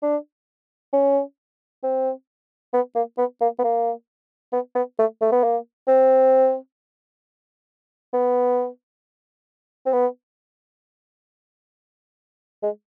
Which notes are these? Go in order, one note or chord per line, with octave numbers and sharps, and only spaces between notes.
D4
C#4
C4
B3
A#3
B3
A#3
B3
A#3
B3
B3
A3
A3
B3
A#3
C4
B3
C4
B3
G#3